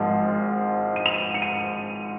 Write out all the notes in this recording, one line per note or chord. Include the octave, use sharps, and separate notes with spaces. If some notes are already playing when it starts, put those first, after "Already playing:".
Already playing: G#1 G#2 F3 G#3
D#7
F7
D#7
C#7
D#7